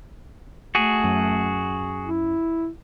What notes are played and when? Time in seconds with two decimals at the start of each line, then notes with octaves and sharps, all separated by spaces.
0.75 A3 F#4 G#4
1.04 F#2
2.05 E4